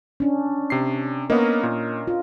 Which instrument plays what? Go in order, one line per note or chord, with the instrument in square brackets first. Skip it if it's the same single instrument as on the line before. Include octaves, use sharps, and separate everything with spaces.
[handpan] C#4 D4
[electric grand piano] C3 C7
[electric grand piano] A#3 B3 [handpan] A#4 C#5 D#5
[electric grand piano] A#2
[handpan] F4